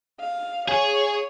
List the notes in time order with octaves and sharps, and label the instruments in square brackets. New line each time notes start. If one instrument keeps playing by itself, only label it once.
[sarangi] F5
[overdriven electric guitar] G#4 [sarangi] C#5